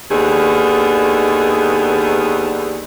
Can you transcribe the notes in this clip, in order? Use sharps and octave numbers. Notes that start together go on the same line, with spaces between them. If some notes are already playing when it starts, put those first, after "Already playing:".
D#2 D3 D#3 B3 G#4